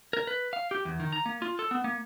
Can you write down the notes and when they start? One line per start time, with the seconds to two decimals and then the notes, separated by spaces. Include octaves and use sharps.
0.13 A#4
0.27 B4
0.53 F5
0.71 G4
0.85 E2
1.00 D#3
1.12 A#5
1.26 A#3
1.42 F4
1.59 A4
1.71 B3
1.84 A#3